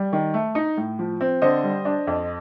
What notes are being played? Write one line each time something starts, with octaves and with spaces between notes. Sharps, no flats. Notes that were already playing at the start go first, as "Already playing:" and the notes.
Already playing: G3
D#3
A3
D#4
A2
F3
C4
D3 C5 D#5
G3
D4
F2